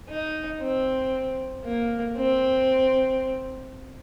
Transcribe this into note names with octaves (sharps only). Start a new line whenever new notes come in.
D#4
C4
A#3
C4